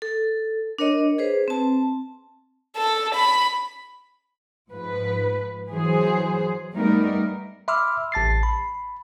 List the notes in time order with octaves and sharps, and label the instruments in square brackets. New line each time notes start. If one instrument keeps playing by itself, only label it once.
[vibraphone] A4
D4 A#4 C#5 D#5
G#4 B4 C5
C4 A5
[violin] A4
B5
[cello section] G#2 F3 B4
E3 F#3 G#4 C5
G3 A3 B3 D#4 A#4
[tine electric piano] E5 B5 C6 D6 E6 F6
A1 A5 A6 C7
B5